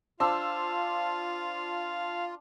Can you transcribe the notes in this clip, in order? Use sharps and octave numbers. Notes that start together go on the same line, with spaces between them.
D4 F4 C5 F5 E6